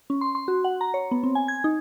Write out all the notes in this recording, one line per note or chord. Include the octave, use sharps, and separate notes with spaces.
C#4
C6
C6
F#4
F#5
A#5
C#5
B3
C4
G#5
G#6
D#4